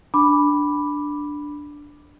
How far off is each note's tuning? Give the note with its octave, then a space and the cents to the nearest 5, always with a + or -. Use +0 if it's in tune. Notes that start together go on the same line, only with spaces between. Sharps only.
D4 +0 B5 +0 D6 +0